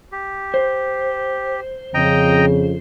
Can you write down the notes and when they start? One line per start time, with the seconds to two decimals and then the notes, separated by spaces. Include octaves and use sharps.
0.12 G4
0.54 C5
1.94 F2 C#3 D#5 G5 A#5